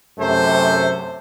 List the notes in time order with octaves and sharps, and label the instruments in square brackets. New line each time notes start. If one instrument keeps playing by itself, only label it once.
[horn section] F#2 C3 A3 C5